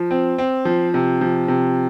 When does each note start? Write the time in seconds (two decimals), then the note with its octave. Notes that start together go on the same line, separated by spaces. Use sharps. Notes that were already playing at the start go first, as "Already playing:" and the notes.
Already playing: F3
0.11 C4
0.38 C4
0.65 F3
0.94 C3
1.21 F3
1.48 C3